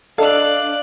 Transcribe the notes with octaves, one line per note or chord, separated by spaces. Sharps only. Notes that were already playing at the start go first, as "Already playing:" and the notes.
D4 A4 D5 D#5 F5 F#6